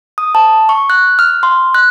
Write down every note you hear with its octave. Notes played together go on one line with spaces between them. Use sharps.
D#6
A5
C#6
F#6
F6
C6
F#6